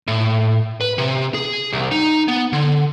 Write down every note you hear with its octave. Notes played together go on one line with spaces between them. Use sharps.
A2
B4
C3
G#4
C2
D#4
B3
D3